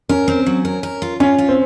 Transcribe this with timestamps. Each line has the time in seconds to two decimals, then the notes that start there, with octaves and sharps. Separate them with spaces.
0.09 C#4 A#4
0.28 C4
0.46 F#3
0.65 A#4
0.83 A#4
1.02 F4
1.20 C#4 F4
1.38 F4
1.48 C4